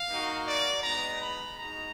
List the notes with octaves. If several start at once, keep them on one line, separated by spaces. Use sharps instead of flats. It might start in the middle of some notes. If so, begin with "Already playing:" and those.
Already playing: F5
A#3 D#4 F#4
D5
G#3 B3 D#4 A#5
B5
G#3 D#4 F#4 A#5